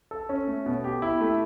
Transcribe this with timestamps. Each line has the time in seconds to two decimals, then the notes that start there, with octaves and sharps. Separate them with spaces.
0.11 A4
0.29 C#4
0.48 A3
0.66 B2
0.84 G4
1.02 E4
1.21 A3